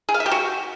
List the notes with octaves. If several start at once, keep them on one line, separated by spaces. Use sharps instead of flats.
G#4
F5
E5
G4
F#4